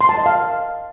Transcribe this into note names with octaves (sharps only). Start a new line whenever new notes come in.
C6
A5
D#5
F5